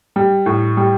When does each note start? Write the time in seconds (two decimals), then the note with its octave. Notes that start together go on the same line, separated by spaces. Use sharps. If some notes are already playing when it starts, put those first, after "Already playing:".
0.16 G3
0.46 A2
0.77 G3